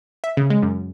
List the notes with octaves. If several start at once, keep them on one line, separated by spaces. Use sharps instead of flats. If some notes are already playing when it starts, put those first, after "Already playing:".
E5
C#3
G#3
F#2